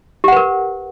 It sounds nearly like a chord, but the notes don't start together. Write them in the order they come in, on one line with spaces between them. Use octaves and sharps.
G4 F#5 B4 A#4